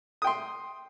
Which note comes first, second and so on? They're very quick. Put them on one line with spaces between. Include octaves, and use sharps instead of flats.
D#6 G5 C6